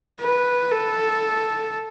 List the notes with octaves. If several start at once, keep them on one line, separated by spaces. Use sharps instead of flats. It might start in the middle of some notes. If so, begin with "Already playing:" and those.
B4
A4